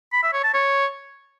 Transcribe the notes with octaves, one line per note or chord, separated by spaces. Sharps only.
B5
E5
C#5
A5
C#5